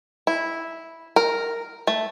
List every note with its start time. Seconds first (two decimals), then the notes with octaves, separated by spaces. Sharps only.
0.27 E4
1.16 A#4
1.87 A3